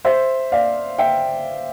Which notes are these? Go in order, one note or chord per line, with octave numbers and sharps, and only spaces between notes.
C5 E5
D5 F5
E5 G5